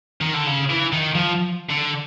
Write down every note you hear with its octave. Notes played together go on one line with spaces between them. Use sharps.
D#3
D3
C#3
E3
D#3
F3
D3